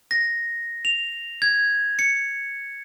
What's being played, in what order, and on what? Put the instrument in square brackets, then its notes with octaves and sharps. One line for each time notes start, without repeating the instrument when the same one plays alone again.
[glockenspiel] A#6
F7
G#6
C#7